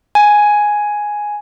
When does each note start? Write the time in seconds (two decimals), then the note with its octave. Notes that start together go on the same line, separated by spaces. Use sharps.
0.15 G#5